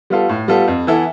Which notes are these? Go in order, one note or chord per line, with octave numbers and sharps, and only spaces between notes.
G3 B3 F4 A4
A2
G3 B3 F4 A4
F2
E3 B3 E4 A4